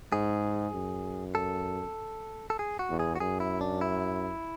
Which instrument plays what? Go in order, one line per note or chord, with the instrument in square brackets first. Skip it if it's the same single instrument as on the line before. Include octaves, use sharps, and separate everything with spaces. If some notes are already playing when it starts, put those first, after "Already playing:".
[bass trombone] G#2 [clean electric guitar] G#4
[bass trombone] F#2
[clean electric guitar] A4
A4
G#4
F#4
[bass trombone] E2
[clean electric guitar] G#4
F#4
[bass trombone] F#2 [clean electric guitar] G#4
[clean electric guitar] E4
D4
E4